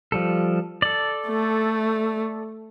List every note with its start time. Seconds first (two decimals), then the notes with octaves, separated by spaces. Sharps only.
0.12 F3 G3 A4
0.82 A4 D5
1.27 A3